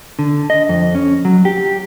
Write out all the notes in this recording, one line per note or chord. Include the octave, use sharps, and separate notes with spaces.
D3
D#5
F2
C#4
F#3
G4